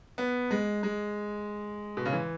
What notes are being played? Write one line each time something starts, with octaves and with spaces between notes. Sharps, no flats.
B3
G#3
G#3
B2
C#3
E3